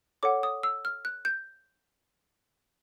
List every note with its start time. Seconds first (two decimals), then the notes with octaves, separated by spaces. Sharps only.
0.23 A4 C#5 F#5 D6
0.43 D#6
0.63 E6
0.85 F6
1.05 F#6
1.25 G6